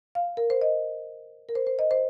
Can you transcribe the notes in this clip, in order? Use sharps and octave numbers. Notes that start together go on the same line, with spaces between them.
F5
A#4
C5
D#5
A#4
C5
C5
D#5
C5